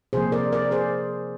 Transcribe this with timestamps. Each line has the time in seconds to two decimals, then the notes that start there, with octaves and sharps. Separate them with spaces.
0.13 C3 F3 A#3 G#4 C5
0.32 A#4 D5
0.52 A#4 D5
0.71 G#4 C5